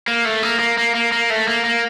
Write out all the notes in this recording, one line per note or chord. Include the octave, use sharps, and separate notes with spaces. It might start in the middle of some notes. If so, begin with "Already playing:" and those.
A#3
A3
A#3
A#3
A#3
A#3
A#3
A3
A#3
A#3